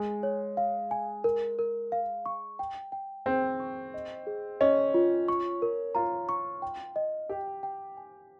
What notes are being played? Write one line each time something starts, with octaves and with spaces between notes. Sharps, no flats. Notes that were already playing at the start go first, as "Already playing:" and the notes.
Already playing: G#3 G#5
C#5
F5
G#5
A#4
A#4
F5
C#6
G5
G5
C4 G#4
C#6
D#5
G#4
C#4 D#5
F4
C#6
A#4
F4 A#5
C#6
G5
D#5
G4 G5
G5
G#5